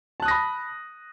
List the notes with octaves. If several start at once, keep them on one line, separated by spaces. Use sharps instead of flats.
A5 B5 D#6 F#6 A#6